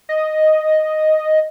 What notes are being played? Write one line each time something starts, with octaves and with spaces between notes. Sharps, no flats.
D#5